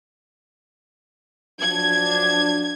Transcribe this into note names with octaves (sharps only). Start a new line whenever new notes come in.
F3 F#3 D4 G#6